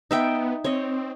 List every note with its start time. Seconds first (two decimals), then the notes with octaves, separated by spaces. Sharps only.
0.11 B3 D#4 E5 G5
0.64 C4 C#5 D#5